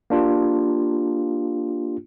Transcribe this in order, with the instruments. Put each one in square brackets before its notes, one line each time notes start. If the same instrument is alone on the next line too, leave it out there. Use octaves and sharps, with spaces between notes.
[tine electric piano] A#3 D4 F4 G4